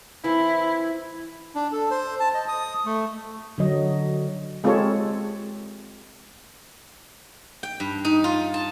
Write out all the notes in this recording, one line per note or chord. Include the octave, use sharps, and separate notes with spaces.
E3 C4 E4
D4
A4
C5
A5
D#5
D#6
A3
D3 F#3 D#5
G#3 C4 F4 G4 A4 C#5
G5
G2
D#4
F4
A5